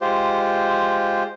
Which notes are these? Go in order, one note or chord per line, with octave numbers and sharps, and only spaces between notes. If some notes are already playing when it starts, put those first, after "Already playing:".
G#3 F4 G4 C5